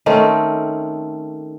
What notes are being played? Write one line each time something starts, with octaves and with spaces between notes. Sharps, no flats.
D#3 A3 C4 C#4